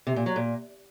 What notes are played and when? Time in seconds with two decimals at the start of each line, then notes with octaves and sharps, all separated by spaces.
0.07 C3
0.16 A#2
0.26 F#3
0.36 A#2